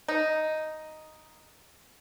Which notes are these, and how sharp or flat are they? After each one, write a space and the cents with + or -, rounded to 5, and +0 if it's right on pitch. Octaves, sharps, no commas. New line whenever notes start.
D#4 +0